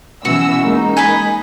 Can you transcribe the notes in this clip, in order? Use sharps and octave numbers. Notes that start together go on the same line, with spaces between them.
B2 E3 C#4 F#4 E6
G#3 A#3 D#4
B4 D#5 G#5